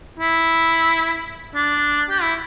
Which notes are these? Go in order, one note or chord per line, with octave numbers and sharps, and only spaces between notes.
E4
D4
G4
E4